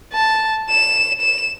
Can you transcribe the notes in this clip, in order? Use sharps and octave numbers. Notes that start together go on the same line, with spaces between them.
A5
E7
E7